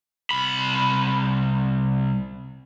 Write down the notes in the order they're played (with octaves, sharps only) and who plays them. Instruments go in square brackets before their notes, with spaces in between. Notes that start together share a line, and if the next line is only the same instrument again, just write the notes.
[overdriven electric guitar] C2 B5